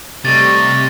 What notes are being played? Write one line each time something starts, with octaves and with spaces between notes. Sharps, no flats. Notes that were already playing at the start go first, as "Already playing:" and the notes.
C3 G3 A3 D#5 C#6 A6